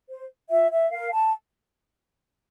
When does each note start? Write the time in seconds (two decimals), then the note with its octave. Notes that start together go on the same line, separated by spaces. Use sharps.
0.09 C5
0.50 F4 E5
0.71 E5
0.92 A#4 F5
1.13 A5